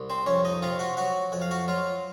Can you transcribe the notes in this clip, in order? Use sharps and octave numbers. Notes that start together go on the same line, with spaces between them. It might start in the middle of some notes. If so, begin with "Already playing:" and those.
Already playing: C2
C4 C5
F2 C#4 C#5
D#4 D#5
C3 F4 F5
F#4 F#5
F#3 F#4 F#5
F2 F#5
F5
F#4 F#5
F#3 F4 F5